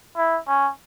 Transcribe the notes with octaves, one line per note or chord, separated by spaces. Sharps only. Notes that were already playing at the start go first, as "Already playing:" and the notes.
E4
C#4